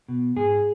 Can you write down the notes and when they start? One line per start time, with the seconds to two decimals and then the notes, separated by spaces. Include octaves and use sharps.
0.08 B2
0.36 G#2 G#4